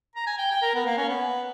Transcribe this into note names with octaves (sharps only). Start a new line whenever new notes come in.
A#5
G#5
G5
G5
A#4
B3
A#3
C#4
B3